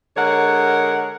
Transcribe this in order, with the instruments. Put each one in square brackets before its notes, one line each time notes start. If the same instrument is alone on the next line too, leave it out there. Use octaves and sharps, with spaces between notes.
[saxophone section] D3 G#3 A#4 C#5 F#5